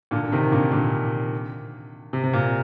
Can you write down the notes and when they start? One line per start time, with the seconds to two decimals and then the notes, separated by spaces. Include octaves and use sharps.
0.11 A#2 D3
0.24 D3
0.32 C3 D#3
0.52 A#2 D3
0.72 A#2 D3
2.13 C3
2.24 C3
2.33 A#2